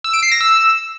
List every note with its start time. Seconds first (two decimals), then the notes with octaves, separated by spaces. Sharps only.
0.04 E6
0.13 D7
0.22 C7
0.32 A#6
0.41 E6